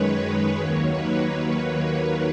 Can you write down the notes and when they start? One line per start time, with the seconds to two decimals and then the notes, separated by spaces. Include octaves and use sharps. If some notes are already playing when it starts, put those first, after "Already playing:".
Already playing: F#2 D#3 G#3 B4 C#5
0.14 C#5
0.60 D#2 D#3 F#3 A#3 C#5
0.91 B4
1.23 B4